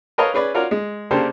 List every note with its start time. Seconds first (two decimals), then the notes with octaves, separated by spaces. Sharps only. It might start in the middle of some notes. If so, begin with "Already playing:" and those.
0.18 A#4 B4 C#5 D#5 F5 A5
0.34 C#4 G#4 B4 D5
0.54 F4 F#4 A#4 C#5 D5
0.71 G#3
1.11 C#3 A#3 D4 G4 A4 C5